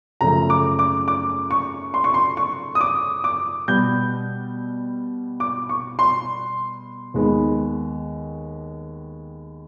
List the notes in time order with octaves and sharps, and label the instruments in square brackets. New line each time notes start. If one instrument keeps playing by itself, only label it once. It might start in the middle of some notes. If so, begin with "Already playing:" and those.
[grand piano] F#2 C#3 F3 A3 A#5
D6
D6
D6
C#6
C6
C#6
C6
C#6
D#6
D6
D6
B2 G3 B3 G6
D6
C#6
C6
D#2 D#3 G#3 B3